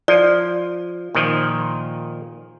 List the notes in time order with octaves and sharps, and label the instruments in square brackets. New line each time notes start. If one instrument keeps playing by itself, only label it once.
[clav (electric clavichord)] F3 [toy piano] D5
[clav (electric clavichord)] A#2 D#3 F3